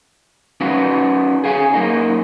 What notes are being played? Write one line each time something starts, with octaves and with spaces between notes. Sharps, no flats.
C#4 D#4 F#4 B4 F5
G#4 F5 G5 G#5
F#2 A#3 D#4